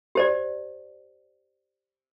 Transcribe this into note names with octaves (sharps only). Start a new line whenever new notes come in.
G4 C5 D5